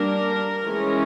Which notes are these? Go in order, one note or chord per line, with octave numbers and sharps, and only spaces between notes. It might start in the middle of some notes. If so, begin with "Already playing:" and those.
Already playing: G3 A#3 D4 A#4
E3 G#3 C#4